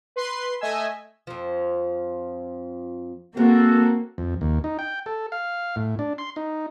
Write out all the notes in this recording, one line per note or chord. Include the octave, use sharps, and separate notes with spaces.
B4 C6 C7
A3 D#5 E5 G#5 E6
F2 F3
G#3 A#3 C4 F#4 A4
F2
D#2
D#4
G5
A4
F5
A2
D4
C6
D#4